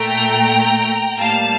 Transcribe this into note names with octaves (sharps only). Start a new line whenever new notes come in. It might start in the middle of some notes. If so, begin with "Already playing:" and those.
Already playing: A#2 A3 G5 A#5
A2 G3 A#3 F5 A5